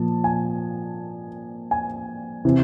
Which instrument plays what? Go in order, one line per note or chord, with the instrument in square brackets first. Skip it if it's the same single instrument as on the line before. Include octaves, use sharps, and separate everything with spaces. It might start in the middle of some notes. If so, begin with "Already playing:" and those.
Already playing: [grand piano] A#2 F3 A5
G#5
G#5
C3 E3